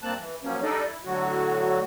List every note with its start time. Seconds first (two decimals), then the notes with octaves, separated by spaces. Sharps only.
0.03 G2 A#3 C4 A5 F#6
0.19 E3
0.44 F3 F#3 A#3 C#4
0.63 G3 D4 D#4 A4 D5 D#5
0.85 E4
1.04 A2 D3 F#3 F#4